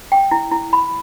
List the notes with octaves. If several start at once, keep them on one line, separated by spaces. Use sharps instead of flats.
G5
E4
E4
B5